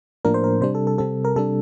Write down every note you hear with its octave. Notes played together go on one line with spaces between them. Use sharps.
A2 F3 A#3 D4 A#4
C5
A#4
C3 G3 D4 C5
A4
A4
C3 G3 C4 A4
A#4
C3 G3 D4 A4